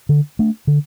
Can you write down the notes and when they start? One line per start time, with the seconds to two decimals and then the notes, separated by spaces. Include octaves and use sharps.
0.09 D3
0.39 A3 D4
0.67 D3